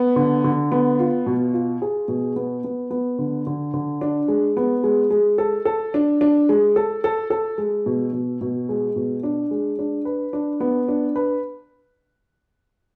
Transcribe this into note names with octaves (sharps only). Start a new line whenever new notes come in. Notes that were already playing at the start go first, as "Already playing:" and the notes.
Already playing: B3
D3
D3
B3
F4
B2
F4
G#4
B2
B3
B3
B3
D3
D3
D3
D4
G#3
B3
G#3
G#3
A4
A4
D4
D4
G#3
A4
A4
A4
G#3
B2
B2
B2
G#3
B2
D4
G#3
D4
B4
D4
B3
D4
B4